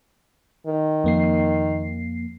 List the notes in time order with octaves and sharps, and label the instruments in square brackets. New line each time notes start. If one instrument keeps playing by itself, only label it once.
[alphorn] D#3
[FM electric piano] F2 A#3 C7